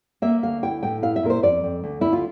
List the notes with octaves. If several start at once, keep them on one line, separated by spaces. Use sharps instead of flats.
A#3 E5
D2 F5
E4 G5
A2 G5
E4 F5
E5
A#2 A#4
C5
F2 D5
F2
D2
D2 E4
F4